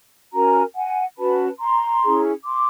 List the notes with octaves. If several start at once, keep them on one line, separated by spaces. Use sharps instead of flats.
C#4 F#4 A#4 G#5 A#5
F#5 G#5
C#4 F#4 B4 A5 B5
A#5 C6
C#4 E4 G#4
C6 D6